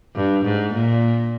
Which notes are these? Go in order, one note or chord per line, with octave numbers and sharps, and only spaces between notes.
G2
G#2
A#2